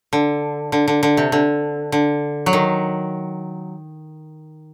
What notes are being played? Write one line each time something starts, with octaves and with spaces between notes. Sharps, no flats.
D3
D3
D3
D3
C3
D3
D3
F#3
D#3